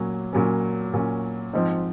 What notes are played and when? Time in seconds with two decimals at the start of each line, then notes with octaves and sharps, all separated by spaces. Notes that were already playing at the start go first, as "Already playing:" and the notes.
Already playing: A#2 F#3 C#4
0.33 A#2 F#3 C#4
0.94 A#2 F#3 C#4
1.53 G#2 F3 C4